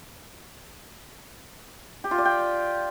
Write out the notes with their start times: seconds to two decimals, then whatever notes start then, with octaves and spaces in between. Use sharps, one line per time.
2.04 G4
2.11 F4
2.18 D5
2.25 G5